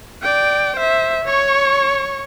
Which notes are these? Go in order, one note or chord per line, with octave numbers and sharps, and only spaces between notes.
D5 G5
C5 E5
C#5 C#6